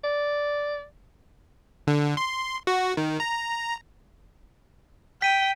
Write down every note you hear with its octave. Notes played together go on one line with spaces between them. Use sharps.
D5
D3
C6
F#4
D#3
A#5
G5 B6 D#7